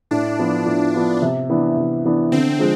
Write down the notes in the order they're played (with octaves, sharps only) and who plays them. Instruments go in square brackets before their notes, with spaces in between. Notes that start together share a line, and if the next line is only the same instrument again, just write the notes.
[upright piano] A2 [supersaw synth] D4
[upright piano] F3 B3 F4
A2
F3 B3 F4
C3
E3 B3 D4
C3
E3 B3 D4
[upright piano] D3 [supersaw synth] C4
[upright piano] F3 G#3